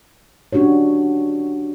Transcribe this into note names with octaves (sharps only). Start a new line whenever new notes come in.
C#4 D4 F#4 G4 C#5